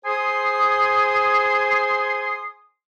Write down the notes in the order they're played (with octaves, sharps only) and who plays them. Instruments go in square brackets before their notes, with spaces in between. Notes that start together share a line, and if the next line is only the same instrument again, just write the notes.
[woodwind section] G#4 C5 G#5 C6 D#6